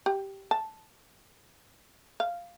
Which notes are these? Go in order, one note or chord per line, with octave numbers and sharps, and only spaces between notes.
G4
A5
F5